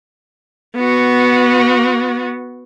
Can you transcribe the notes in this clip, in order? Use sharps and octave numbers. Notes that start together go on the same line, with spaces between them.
B3 F#4